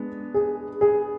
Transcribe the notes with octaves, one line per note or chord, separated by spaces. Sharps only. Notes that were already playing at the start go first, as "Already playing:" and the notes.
Already playing: G#3 B3 D4
G#4
G#4